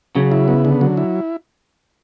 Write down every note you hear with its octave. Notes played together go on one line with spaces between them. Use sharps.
C#3 F#3
E4
B3
D3
F#3
E4